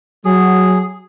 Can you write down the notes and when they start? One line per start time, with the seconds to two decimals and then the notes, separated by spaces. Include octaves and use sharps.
0.25 F#3 G#4